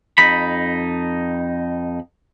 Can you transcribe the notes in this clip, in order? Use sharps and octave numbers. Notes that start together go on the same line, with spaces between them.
F2 D#4 B5